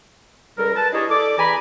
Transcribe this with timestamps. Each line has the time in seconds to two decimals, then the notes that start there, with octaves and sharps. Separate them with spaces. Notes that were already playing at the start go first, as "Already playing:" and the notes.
0.58 C#2 G3 A4 A#4
0.76 B4 A5
0.93 D4 E4 G4 G#4 C#5 D#5
1.10 A4 D5 D6
1.38 E2 E3 G#5 A#5 B5